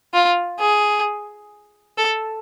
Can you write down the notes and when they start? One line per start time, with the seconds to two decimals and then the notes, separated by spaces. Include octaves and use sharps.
0.14 F4
0.59 G#4
1.98 A4